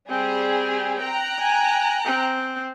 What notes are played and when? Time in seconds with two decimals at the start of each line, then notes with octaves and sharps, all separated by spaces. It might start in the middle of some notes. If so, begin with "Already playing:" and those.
0.10 G3 C4 G#4
1.02 G5 A#5 F#6
1.40 G#5
2.05 C4